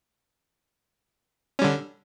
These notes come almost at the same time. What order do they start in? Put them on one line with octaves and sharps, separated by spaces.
C#4 G3 D3